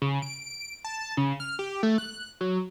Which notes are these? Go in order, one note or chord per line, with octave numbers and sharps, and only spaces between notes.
C#3
D7
A5
C#3
F6
G4
A3
F#6
F#3